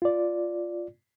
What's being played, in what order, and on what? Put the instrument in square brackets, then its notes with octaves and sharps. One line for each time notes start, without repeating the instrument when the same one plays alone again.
[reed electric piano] F4 D5